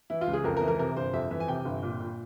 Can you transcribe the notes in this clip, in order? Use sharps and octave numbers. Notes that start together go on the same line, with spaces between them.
E3 E4
F4
C#2
G#4
F2 A#4
A#4
E3
A#4
C3 A#4
G1 C5
F2 E5
E3 E5
G#5
C3 G5
G1
A#2
A#2